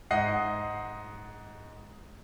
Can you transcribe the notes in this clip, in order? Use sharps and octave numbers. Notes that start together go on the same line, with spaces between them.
G#2 D#5 F#5 C7